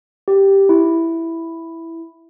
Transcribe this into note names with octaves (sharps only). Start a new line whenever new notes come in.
G4
E4